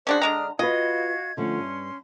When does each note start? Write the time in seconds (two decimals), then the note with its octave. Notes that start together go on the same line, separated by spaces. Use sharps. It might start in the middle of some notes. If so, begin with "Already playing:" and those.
0.07 C#4 D4 F#4 G#4 C5 D5
0.21 D3 G#3 D4 A#5 D#6 F6
0.59 F4 F#4 B4 D#5 F5 G#6
1.37 D3 F3 A3 C#4 C6
1.58 G2